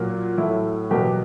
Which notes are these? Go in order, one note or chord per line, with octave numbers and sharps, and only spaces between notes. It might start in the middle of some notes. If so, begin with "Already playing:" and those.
Already playing: A#2 F#3 A#3
A2 F#3 A3 E4
E2 B2 F#3 A#3 G4